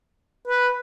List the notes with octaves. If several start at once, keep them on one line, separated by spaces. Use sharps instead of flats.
B4